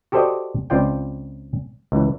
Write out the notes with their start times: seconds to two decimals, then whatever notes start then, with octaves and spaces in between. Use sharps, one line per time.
0.12 F#4 G4 A4 C5 D5 D#5
0.70 C#2 C4 F4 D5 G5
1.92 C#2 E3